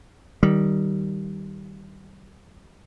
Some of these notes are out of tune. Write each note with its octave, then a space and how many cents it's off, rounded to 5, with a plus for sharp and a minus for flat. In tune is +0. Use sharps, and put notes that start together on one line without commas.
D#3 +0 G3 -15